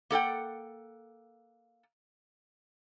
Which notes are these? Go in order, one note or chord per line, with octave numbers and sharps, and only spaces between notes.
A#3 A4 F#5 G5